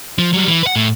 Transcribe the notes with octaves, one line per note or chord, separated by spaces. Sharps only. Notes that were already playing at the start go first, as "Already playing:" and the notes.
F3
F#3 G3
E3
B4 F#5
A2